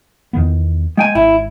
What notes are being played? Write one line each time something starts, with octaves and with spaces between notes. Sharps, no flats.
E2 D#3 B3
G#3 G5 G#5
G#1 E4